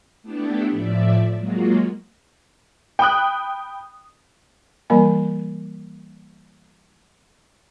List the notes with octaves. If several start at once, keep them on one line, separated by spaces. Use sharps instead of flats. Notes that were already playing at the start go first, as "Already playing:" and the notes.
A3 B3 D4 E4 G4 A4
A2 F3 D5 E5
F#3 G#3 A#3 F4 F#4
G5 B5 D#6 F#6
E3 G3 A#3 A#4 G#5 B5